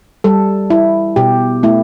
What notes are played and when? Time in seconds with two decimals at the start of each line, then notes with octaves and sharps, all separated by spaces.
0.24 G3 A4
0.70 E4
1.16 B2 G4
1.63 A3 E4